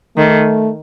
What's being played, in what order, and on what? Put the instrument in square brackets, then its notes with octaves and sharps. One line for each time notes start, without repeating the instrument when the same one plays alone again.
[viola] D#3 [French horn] A3